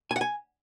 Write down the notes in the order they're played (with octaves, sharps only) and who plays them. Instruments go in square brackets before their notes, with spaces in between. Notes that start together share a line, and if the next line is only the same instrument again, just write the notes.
[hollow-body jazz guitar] G#5
F#5
G#5